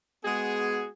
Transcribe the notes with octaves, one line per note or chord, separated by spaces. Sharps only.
G#3 B3 F#4 G#4